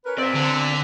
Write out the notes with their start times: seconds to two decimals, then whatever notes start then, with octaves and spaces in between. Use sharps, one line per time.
0.05 C#4 A#4 B4
0.18 C4 D5 F5
0.35 D3